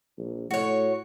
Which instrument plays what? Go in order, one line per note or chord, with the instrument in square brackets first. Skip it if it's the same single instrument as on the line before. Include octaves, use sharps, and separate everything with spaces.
[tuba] A#1
[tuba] A2 [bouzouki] F#4 C#5